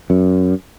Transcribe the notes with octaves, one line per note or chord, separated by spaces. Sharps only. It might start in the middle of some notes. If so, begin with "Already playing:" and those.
F#2